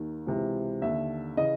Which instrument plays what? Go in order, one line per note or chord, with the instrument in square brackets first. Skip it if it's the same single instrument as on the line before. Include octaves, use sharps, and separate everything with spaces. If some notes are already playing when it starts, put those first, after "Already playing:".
Already playing: [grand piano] D#2 D#3
C#2 C3 E3
D#2 D3 E5
C#3 E3 D#5